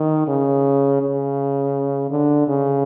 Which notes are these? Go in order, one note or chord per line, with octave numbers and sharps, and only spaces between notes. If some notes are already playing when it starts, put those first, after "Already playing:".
Already playing: D#3
C#3
C#3
D3
C#3